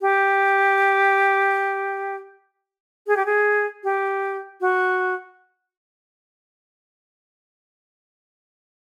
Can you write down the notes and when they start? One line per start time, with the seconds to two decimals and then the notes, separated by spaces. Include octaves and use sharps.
0.01 G4
3.07 G#4
3.17 G4
3.26 G#4
3.84 G4
4.61 F#4